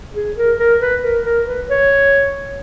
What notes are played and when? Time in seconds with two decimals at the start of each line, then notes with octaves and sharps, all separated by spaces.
0.15 G#4
0.36 A#4
0.59 A#4
0.80 B4
1.03 A#4
1.25 A#4
1.46 B4
1.69 C#5